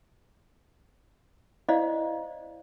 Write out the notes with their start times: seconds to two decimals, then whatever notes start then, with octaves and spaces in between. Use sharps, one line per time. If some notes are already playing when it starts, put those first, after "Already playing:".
1.69 E4 C5 D5 D#5 F5